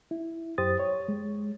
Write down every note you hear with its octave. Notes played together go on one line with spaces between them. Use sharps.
E4
F#2 G4 C5 D#6 A6
C#5
G#3